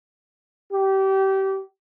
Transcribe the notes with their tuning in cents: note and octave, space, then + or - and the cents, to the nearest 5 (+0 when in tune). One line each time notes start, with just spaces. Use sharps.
G4 -25